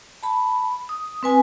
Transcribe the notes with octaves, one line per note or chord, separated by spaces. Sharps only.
A5 B5
D#6
C4 B4 G#5